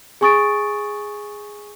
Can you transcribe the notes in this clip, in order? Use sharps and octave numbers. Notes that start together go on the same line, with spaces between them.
G#4 G#5 C#6 D#6 A6 D7